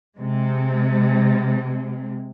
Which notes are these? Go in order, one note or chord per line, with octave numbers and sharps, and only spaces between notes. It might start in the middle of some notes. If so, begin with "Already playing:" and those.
C3 G#3